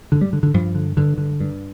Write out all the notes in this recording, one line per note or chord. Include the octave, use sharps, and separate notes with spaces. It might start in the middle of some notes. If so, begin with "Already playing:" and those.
G2 D3
G3
D3
D3
G2 F3
D3
G2 D3
D3
G2